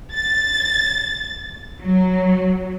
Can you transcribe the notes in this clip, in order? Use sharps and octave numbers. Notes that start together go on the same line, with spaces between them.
A6
F#3